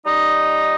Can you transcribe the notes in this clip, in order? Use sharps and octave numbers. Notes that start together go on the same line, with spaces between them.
G3 D#4 D#5